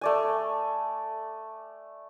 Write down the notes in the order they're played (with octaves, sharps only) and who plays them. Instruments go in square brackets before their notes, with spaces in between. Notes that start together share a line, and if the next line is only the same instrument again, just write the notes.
[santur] A3 D5 G#5